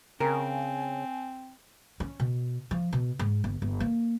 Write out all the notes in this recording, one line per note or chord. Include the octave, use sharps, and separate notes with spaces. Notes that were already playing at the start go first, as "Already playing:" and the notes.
C#3 C4 A#4 G#5
C#4
B2
F3
B2
G#2
G1
G1
A#3